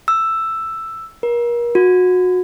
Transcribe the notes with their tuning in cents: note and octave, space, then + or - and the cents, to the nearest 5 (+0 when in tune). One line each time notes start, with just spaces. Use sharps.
E6 +5
A#4 +35
F#4 -25